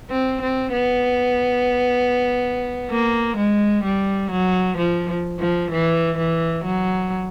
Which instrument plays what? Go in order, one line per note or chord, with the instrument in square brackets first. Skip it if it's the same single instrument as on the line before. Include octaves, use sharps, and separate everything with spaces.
[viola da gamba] C4
C4
B3
A#3
G#3
G3
F#3
F3
F3
E3
E3
F#3